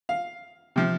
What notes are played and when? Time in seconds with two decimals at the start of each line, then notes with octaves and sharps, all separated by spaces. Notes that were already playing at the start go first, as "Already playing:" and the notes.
0.09 F5
0.76 C3 F3